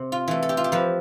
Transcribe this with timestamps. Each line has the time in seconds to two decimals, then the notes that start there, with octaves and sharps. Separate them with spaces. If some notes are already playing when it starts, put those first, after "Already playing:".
Already playing: C3
0.12 F4
0.28 E3 A3
0.43 A4
0.49 G4
0.57 F4
0.64 G4
0.72 F3 B4